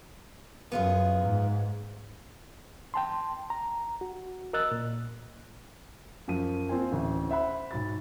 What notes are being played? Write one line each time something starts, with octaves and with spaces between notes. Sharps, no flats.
F#2 B3 F4 G#4
G#2
G5 A5 C6
A#5
F#4
A#4 D#5 E6 F#6 A6
A#2
F#2 F3 D#7
A#3 C4 F4 C5 G#5
A1 D2
C5 E5 F#5 B5
B1 G#2 F#3 B5 A6